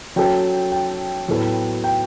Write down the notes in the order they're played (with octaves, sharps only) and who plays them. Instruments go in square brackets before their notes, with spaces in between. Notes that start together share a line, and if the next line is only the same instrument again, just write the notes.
[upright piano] F#3 C#4 F#4 A4 [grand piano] G5
[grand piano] G5
[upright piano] A2 F#3 B3 F#4 A4
[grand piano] G5